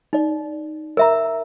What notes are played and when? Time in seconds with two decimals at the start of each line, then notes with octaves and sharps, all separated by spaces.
0.13 D#4 D5
0.97 A#4 E5 A#5